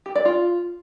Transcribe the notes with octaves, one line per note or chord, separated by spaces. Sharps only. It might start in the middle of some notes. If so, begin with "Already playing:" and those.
G4
D5
F4